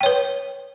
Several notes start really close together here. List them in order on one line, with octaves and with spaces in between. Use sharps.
G5 C#5 B4